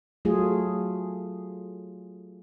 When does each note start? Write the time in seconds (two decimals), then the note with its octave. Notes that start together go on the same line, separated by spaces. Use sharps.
0.25 F#3 A3 F4 G#4